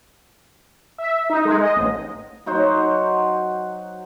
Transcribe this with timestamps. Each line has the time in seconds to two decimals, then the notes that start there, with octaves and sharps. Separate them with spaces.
0.98 E5
1.30 D#4
1.45 G#3
1.60 D#5
1.76 A1
2.46 F#3 D#4 F#4 C5